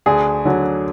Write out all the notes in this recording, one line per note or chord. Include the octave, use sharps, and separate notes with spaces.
D2 G#4
D3 F#3